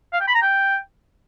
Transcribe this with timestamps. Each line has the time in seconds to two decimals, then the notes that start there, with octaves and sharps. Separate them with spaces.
0.13 F5
0.20 G5
0.27 B5
0.34 A#5
0.42 G5